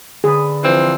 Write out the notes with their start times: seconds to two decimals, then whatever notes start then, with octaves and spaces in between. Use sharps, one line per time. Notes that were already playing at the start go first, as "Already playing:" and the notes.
0.24 D3 G#4 B4
0.64 E3 F3 C4